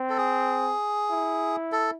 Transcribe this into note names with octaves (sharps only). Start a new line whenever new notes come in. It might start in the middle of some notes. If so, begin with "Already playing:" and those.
Already playing: C4
A4
G#4
E4
A4